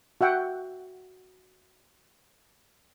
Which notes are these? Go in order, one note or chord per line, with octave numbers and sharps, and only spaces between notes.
F#4 E5 F#5 G5